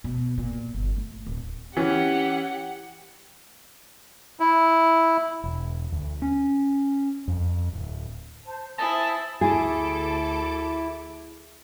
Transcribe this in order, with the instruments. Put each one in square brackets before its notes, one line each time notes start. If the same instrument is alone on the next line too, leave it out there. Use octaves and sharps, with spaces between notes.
[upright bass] B2
A#2
G1
A3
D1
[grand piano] E3 C#4 [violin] G4 F#5
[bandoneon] E4
[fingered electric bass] E1
D2
C#4
F2
D1
[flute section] C5 A5
[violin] E4 C5 [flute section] G#5 D#6 E6 [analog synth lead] A5
[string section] D2 A4 D6 [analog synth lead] E4 [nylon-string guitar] G#4